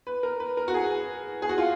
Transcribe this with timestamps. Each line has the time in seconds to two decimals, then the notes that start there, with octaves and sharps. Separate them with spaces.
0.07 B4
0.23 A#4
0.40 B4
0.57 A#4
0.68 F#4
0.74 G#4
1.42 G#4
1.49 F#4
1.58 F4